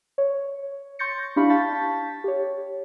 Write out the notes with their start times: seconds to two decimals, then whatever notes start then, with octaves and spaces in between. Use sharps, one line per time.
0.18 C#5
0.99 C6 C#6 G6 A6 A#6 C#7
1.36 D4 E4 G4 F5 B5 C#6
1.50 F5 A5 C#6 G6 A6 B6
2.24 G4 C#5